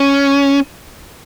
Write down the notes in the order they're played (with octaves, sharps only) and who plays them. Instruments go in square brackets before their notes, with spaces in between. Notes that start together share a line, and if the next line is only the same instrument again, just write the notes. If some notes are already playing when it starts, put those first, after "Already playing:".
Already playing: [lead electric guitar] C#4